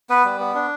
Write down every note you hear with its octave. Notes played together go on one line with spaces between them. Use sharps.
B3 B4
G3
B3
D4